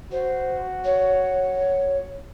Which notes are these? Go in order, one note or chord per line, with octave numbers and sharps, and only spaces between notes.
F#4 C5
C#5